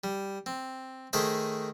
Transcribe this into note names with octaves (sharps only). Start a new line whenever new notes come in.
G3
C4
D#3 A3 G#4 C5 D#5 B5